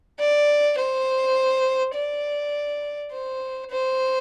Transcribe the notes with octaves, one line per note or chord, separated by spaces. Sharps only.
D5
C5
D5
C5
C5